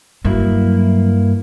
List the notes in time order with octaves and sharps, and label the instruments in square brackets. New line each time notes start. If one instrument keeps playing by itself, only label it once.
[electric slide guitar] G2 A#3 E4 [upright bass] F#3